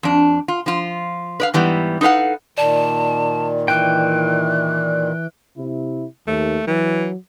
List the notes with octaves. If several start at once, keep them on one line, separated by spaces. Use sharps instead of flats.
F2 D4
F4
F3 F4
B4 D5 F5
G#2 E3 G3 B3
D#4 A4 B4 F5 F#5
A#2 D#3 D5 A5
E3 G5 F#6
C3 E4
D#2 A3
E3 F#3